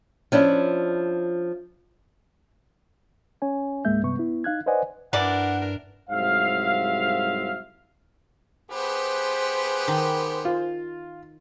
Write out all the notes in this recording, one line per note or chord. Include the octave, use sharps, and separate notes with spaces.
F3 C#4 D4 E4
C#4 C#5 G#5
C#2 G#2 G#3 A#3 E5 G6
G2 C3 B3 C#6
B3 E4
D#4 F5 F#6 G#6
B4 C5 D5 D#5 F#5 G#5
G2 E3 D4 A#4 D5 F#5
C2 G#2 F#3 C5 E5 F5
B3 G4 G#4 B4 C5
D#3
F4